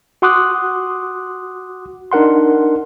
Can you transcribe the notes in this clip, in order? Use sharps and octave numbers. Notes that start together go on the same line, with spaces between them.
F#4 F#5 C6 D6 D#6 F#6
D4 D#4 A#4 F#5 C6